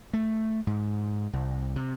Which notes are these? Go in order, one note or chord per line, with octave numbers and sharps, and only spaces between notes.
A3
G#2
C2
C3